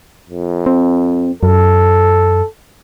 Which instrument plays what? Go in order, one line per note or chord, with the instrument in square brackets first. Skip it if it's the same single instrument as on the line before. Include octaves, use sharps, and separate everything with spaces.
[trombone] F2
[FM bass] C4
[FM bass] F#2 [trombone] A4